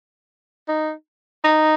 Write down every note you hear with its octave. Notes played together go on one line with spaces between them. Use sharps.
D#4
D#4